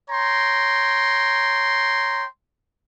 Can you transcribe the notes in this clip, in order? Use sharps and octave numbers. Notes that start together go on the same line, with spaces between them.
C#5 G5 A#5 C6